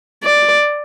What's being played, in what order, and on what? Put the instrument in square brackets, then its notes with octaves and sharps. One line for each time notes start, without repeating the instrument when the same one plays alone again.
[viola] D5